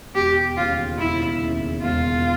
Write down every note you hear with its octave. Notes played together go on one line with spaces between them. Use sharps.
E1 G4
D#2 C#3 F4
E1 E4
D#2 C#3
E1 F4